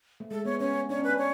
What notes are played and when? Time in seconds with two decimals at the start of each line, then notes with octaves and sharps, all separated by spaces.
0.20 A3
0.31 G#3 A4
0.45 B3 C#5
0.60 C#4 C#5
0.89 D4 C#5
0.99 C#4 B4
1.09 D4
1.18 C#5